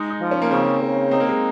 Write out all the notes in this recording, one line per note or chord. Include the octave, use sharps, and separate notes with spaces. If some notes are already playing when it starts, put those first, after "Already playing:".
Already playing: G#3 D#4
D#4
F3
C#4
A#3
C#3 C4
C#3
C4 D#4
A#3
G#3